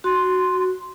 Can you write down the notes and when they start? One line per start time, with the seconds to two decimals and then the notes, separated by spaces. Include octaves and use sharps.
0.04 F#4 C6